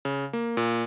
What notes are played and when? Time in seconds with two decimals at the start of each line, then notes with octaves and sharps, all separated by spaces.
0.05 C#3
0.33 A#3
0.57 A#2